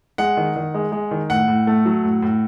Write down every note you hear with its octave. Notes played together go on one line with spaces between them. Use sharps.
G#3 F#5
D#3
D#3
G#3
G#3
D#3
A2 F#5
A2
A3
F#3
A2
A2